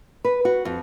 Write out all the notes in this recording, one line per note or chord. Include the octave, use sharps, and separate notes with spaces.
B4
F#4
F2